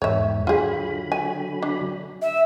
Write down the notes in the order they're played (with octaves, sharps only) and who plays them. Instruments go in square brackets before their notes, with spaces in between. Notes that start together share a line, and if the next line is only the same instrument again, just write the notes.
[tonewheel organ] E2 G#2 [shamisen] C#5 E5
[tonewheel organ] D3 F#3 B5 [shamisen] F4 G#4
[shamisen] G#5
D4
[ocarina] E5